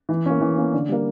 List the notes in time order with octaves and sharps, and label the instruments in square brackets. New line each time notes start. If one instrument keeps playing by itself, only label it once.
[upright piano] E3
A#3 C#4
E3
A#3 C#4
D3
G3 A#3